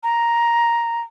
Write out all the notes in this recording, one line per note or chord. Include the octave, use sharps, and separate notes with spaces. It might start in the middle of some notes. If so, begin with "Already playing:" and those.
A#5